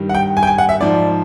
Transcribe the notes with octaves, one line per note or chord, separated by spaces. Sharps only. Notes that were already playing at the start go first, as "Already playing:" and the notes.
Already playing: G2 D#3 G3
F#5
G5
G#5
G5
G#5
F#5
E5
G#2 F3 D5